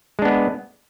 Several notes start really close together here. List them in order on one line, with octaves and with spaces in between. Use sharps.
G#3 D4 B3